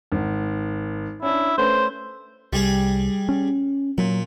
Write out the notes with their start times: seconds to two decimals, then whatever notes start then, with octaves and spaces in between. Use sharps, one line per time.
0.12 G#1
1.22 C#4 D4 E4
1.58 A3 C#4 B4 C5
2.53 C2 G3 G#4
3.29 C#4
3.98 A#2 F#3